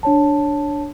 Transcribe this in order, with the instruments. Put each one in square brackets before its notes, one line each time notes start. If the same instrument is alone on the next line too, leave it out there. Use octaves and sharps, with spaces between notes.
[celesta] D4 C#5 A5